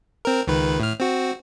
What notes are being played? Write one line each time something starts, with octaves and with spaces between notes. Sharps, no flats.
C4 A#4
C#2 D#3 B4
A2 F6
C4 F#4